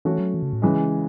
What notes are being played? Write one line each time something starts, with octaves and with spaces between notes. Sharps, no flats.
E3 A3 C#4 F#4
F#3
E3
C#3
A2
C#3 E3 G#3